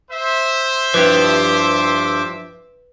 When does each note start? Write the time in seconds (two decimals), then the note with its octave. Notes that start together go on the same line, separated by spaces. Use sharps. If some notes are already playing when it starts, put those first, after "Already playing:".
0.11 C5 E5
0.94 G2 F3 E4 G4 B4 D6